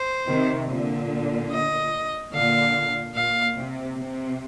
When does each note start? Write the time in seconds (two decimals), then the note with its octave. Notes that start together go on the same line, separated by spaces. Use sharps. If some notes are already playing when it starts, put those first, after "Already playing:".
Already playing: C5
0.30 C3 D#3
0.70 A#2 D3
1.52 D#5
2.33 A#2 D3 F5
3.15 A#2 F5
3.57 C3
3.97 C3